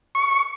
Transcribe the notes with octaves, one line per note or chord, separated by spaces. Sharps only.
C#6